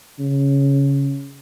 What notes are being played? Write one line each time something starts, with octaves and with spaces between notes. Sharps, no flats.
C#3